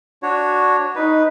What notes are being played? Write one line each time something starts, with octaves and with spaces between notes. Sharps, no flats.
D4 F#4 C#5
D#4 B4